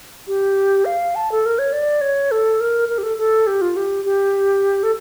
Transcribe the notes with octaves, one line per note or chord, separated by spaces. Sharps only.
G4
F5
A5
A4
A#4
C#5
D5
C#5
A4
A#4
A#4
G4
A4
A4
G4
F4
G4
G4
A4